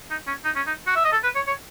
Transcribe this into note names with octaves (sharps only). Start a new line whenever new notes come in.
D#4
C#4
D#4
C#4
D#4
F#4
E5
D#5
A4
B4
C#5
C#5